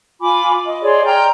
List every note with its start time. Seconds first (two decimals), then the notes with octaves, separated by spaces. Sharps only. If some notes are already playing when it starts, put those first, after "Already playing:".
0.21 F4 G#5 B5 D6
0.65 D#5
0.82 G#4 C#5 D5 C6
1.05 G5 A#5 F6 G6